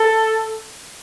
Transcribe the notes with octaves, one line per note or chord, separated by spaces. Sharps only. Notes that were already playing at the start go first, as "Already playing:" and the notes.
Already playing: A4